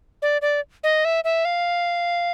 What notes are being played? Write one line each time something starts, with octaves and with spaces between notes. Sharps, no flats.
D5
D5
D#5
E5
E5
F5